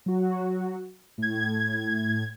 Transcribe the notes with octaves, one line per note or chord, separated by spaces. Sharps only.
F#3 F#4
A2 G#6